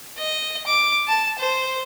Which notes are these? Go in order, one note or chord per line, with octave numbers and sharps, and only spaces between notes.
D#5
D6
A5
C5